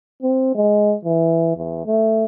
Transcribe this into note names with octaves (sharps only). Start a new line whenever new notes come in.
C4
G#3
E3
E2
A3